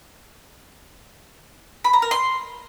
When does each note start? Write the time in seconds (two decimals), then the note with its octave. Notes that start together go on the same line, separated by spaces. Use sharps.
1.84 B5
1.93 A#5
2.02 A#4
2.11 C6